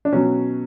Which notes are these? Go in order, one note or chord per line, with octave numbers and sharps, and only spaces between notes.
D4
B2 F#3 C#4